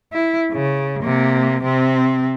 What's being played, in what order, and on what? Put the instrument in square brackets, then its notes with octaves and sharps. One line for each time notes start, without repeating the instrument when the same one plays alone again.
[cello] E4
C#3
C3 A#3
C3 C4